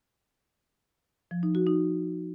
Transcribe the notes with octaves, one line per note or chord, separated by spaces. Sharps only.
F3
D#4
F#4
D#4